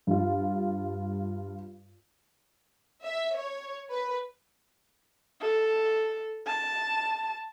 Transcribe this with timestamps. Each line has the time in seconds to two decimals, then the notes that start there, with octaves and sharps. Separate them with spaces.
0.07 G2 F4
3.03 E5
3.37 C#5
3.91 B4
5.40 A4
6.46 A5